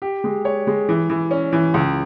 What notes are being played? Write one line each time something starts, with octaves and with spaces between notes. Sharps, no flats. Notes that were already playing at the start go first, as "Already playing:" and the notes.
G4
G#3
C#5
G#3
E3
E3
C#4
E3
C#2